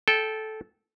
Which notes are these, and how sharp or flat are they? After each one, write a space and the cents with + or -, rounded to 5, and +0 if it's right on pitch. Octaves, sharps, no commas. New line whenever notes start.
A4 -15 G5 +0